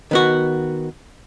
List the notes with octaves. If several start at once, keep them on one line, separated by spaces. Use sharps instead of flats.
D#3 B3 F#4